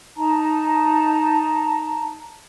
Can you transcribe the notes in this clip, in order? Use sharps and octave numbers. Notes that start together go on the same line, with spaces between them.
D#4 A5 A#5